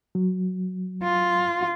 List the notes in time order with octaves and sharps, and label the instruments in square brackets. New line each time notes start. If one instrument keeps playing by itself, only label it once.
[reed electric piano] F#3
[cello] F4